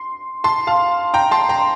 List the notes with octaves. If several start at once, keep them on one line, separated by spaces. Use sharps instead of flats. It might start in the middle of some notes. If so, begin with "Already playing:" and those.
Already playing: C6
A5 C6
F5 A5
G5 A#5
A5 C6
G5 A#5